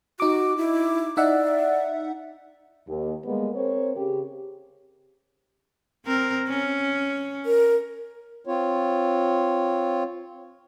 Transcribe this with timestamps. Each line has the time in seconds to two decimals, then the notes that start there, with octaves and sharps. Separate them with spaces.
0.20 D#4 F#4 D6
0.58 E4
1.17 D#4 D5 E5 F#5
2.88 D#2
3.25 G3 G#3 A#3 B3
3.55 C4 A#4 C5 C#5
3.96 C#3 G4
6.06 C4 A#4
6.48 C#4
7.46 A#4
8.46 C4 F4 C#5